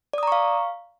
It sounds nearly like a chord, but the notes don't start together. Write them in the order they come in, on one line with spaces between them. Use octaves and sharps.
D5 D#6 A#5 C#6 F5